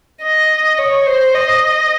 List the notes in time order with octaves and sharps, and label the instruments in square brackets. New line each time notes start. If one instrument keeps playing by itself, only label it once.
[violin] D#5
C#5
C5
D#5